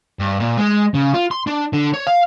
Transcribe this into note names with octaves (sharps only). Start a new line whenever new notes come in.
G2
A#2
G#3
C#3
F4
C6
D4
D3
C#5
F5